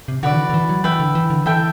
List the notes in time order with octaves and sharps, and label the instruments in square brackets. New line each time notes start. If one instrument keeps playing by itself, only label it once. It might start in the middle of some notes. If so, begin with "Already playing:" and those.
[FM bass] C3
[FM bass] D3 [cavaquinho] F#4 B4 D5
[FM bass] E3
D3
D3
E3
F#3
[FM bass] E3 [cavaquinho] B4 E5 G5
[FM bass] D3
E3
D3
[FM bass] E3 [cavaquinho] A4 E5 G5